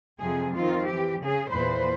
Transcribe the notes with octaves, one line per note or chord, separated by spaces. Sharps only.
F2 C3 F3 G#4
D#3 C4 F4
E3 G4
C#3 G#4
E2 A#2 B4 C5